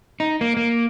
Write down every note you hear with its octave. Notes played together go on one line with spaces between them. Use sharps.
D#4
A#3
A#3